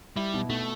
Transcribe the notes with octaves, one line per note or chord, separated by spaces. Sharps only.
G3 E4
B2
B2 A3